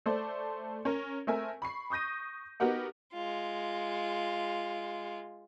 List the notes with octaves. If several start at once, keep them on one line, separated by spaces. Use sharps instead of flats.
A3 A4 C5 D5
C#4 A#4
A3 C4 A#4 E5 G#5
B5 C#6 C7
C#6 D#6 G6 A#6 D#7
B3 D#4 F#4 G4 A#4 F#5
G#3 F4